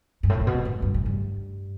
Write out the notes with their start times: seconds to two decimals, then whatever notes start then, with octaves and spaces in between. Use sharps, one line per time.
0.23 G2
0.30 A2
0.41 A2
0.47 B2
0.65 A2
0.82 G2
0.94 A2
1.06 G2